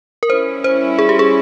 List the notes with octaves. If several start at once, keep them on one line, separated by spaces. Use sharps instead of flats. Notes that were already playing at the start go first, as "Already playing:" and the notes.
A#4
G3 C#4 E4 C5
C5
G#4
G4
G#4